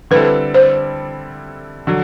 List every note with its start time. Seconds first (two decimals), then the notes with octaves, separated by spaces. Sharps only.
0.11 D3 G3 C4 E4 A4 B4
0.54 C5
1.87 D3 F#3